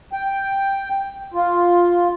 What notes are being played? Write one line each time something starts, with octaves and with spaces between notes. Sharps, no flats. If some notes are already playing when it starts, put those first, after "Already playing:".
G5
F4